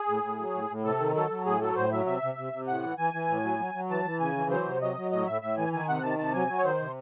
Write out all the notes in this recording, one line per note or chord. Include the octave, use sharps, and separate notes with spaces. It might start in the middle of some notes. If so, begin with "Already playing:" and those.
Already playing: G#4
A2
A2
F#3
A2
A2
C3 A4
D#3
F#3 A4
F#3
A2 G#4
F#3 A4
A2 C5
F#3 E5
C3 E5
C3
C3
C3
A2 F#5
E3
E3 G#5
E3
A2
F#3
F#3
F#3
E3 A5
E3
C#3 G#5
E3
F#3 C5
C3
F#3 D#5
F#3
A2 D#5
A2 E5
A2 E5
E3 G#5
D#3 G#5
C3 F#5
D#3 A5
C3 A5
F#3 G#5
F#3
C#5
D#3 C5
C3